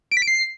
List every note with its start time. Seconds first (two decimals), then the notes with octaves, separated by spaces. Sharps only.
0.11 D7
0.17 B6
0.22 D7
0.27 C7